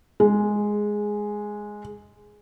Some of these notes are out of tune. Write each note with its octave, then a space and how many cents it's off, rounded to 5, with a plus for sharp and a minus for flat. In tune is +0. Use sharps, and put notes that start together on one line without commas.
G#3 +0